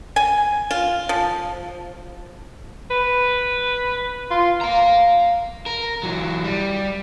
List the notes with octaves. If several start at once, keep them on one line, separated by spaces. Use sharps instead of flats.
G#5
F4
F3
B4
F4
F5 A#5
A#4
E3 F#3
G3